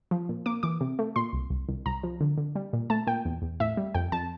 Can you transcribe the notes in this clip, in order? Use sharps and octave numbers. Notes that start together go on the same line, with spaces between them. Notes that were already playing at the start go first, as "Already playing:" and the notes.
F3
A#2
A#3 D6
E3 D6
C3
A3
A#2 C6
C2
C2
C2
C2 A#5
F3
D3
D3
G3
A#2
A3 A5
A#2 G5
E2
E2
A2 E5
G3
F2 G5
F2 A5